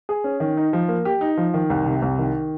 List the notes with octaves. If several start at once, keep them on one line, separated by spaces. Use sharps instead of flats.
G#4
C#4
D#3
D#4
F3
A#3
G4
D#4
F3
D#3
C2
C3
C2
D#3